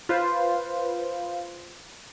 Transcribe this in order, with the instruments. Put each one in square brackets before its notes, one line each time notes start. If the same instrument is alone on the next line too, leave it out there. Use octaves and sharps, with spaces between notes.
[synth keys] F4 B4 C5